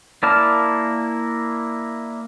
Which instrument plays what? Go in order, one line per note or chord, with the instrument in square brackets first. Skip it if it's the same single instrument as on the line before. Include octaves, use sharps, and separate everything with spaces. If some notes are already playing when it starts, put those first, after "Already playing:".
[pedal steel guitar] A#3 E4 D5 A5 F6